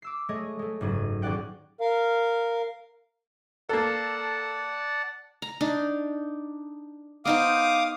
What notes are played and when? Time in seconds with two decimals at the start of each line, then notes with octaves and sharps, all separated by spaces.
0.02 D6 E6 C7
0.29 G#3 A3 C#5 D#5
0.59 G#3 A3
0.81 F#1 G#2 F#3 D#7
1.22 D#1 C#4 G4 D5 F#5 G5
1.81 A#4 F5
3.69 A#3 A4 D5 F#5 A5
5.42 A#5
5.61 D4 D#4
7.25 B3 D#4 C5 F5 D6 D#6